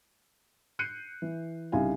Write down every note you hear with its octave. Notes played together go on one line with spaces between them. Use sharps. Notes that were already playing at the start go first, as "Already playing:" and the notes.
F#6 G6 C7 C#7 D#7
E3
C2 C#3 D#4 E4 F5 G#5